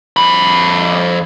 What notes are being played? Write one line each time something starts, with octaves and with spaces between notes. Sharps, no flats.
F2 B5